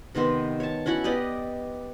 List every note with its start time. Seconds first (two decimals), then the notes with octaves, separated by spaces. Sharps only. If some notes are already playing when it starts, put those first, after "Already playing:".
0.15 C3 D#3 B3 C5
0.60 C#5 A5
0.86 C#4 E4 F#4 F#5
1.04 B3 G4 D5 D#5